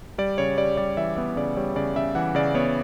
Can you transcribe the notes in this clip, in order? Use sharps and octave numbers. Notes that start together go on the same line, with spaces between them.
G3 D5
C#3 C#5
G3 D5
G3 D5
E3 E5
B3 E5
C#3 D5
G3 C#5
C#3 D5
C#3 E5
E3 F#5
C#3 D5
B3 C#5